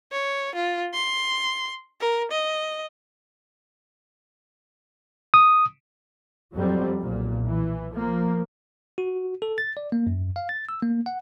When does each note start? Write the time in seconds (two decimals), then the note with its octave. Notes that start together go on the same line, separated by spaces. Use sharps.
0.12 C#5
0.55 F4
0.93 C6
2.01 A#4
2.31 D#5
5.34 D#6
6.53 F2 F#3 G3 C4
7.01 B1 A#2
7.47 E3
7.94 F3 A#3
8.98 F#4
9.42 A4
9.58 A6
9.77 D5
9.92 A#3
10.07 F#2
10.36 F5
10.49 A6
10.69 E6
10.82 A#3
11.06 F#5